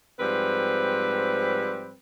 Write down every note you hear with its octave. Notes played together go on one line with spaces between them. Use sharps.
G#2 F3 G3 C4 B4